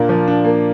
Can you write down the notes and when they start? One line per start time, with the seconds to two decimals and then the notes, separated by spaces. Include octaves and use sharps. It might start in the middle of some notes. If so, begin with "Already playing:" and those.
Already playing: A#2 A#3 D4
0.09 F3
0.28 D4
0.44 A#3